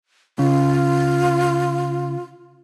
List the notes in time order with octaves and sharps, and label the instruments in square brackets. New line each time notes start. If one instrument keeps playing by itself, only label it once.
[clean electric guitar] C#3 [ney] F4